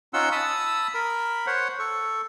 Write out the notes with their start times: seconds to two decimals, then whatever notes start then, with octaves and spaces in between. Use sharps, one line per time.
0.14 C#4 D#4 F4 F#5 C6 E6
0.32 A5 B5 D#6 E6
0.94 A#4 B5
1.47 C5 C#5 F#5
1.79 A4 C#6